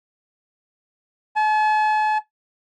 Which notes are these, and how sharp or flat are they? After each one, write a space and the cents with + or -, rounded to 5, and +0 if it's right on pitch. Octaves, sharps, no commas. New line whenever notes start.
A5 -45